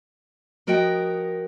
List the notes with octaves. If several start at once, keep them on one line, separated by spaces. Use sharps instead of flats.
F3 F#4 A#4 D#5 F#5 G5